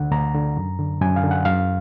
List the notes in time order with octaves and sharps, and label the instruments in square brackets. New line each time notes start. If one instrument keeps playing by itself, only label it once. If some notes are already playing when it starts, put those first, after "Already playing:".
Already playing: [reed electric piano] D2 D3 F#5
D2 A#5
D3
F#2
D3
F#2 G#5
F5
D3
F#5
F#2 F5